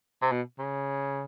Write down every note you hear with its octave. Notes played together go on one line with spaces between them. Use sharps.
C3
B2
C#3